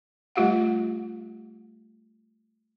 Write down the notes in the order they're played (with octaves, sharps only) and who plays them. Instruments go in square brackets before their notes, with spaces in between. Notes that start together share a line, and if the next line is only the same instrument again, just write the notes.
[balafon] G3 A3 F4 G4 F5 F#5